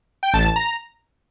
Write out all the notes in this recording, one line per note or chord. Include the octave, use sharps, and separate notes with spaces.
G5
A1 A5
A#5